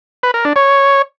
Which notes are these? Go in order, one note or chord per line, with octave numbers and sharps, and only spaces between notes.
B4
A#4
D4
C#5